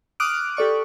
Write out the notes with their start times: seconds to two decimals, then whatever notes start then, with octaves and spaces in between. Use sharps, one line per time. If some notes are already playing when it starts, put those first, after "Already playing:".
0.20 D6 D#6 F6 F#6 D7
0.57 G4 A4 D5 C#6